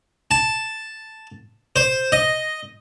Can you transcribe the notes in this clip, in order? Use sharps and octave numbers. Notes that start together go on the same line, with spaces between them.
A5
C5
D#5